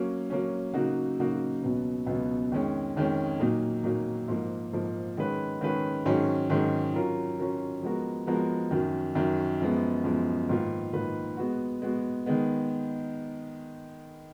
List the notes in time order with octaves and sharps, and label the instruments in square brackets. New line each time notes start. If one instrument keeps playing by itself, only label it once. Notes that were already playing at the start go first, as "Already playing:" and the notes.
Already playing: [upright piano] F#3 A#3 C#4
F#3 A#3 C#4
C#3 F#3 A#3 D#4 F#4
C#3 F#3 A#3 D#4 F#4
C#2 B2 F#3 B3
C#2 B2 F#3 B3
F2 D#3 G#3 C#4
F2 D#3 G#3 C#4
A#2 F#3 A#3 D#4
A#2 F#3 A#3 D#4
G#2 F3 A#3
G#2 F3 A#3
D#3 G#3 C#4 G#4 B4
D#3 G#3 C#4 G#4 B4
G#2 D#3 F#3 C#4 G#4
G#2 D#3 F#3 C#4 G#4
F#3 C#4 F4 A#4
F#3 C#4 F4 A#4
F3 G#3 B3 F#4 A#4
F3 G#3 B3 F#4 A#4
F#2 D#3 F#3
F#2 D#3 F#3
F#2 F3 G#3 B3
F#2 F3 G#3 B3
G#2 D#3 A#3 F4 B4
G#2 D#3 A#3 F4 B4
G#3 B3 F#4
G#3 B3 F#4
D#3 G#3 B3